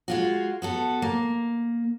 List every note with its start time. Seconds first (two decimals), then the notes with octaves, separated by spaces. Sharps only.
0.08 G#3 F4 F#4
0.62 B3 F#4 A4
1.02 A#3